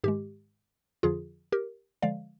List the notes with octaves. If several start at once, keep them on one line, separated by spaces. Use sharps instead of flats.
G#2 D#3 G#3 G4
F2 D3 F3 F4 G#4
G4 A#4
D3 F3 G#3 D5 F5